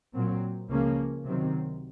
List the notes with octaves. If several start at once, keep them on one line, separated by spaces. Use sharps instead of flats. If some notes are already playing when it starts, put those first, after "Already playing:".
A#2 F#3 C4
C#2 C#3 F3 A#3 C#4
C3 D#3 F#3 C4